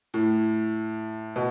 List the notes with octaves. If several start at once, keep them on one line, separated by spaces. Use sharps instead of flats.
A2
B2